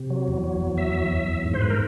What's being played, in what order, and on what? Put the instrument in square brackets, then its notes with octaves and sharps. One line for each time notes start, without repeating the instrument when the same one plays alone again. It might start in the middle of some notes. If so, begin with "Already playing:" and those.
Already playing: [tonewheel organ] C3
F#3
E2
F#3
E2
F#3 E5
E2
E2
E2
G#2
C5
G#2 B4
A#4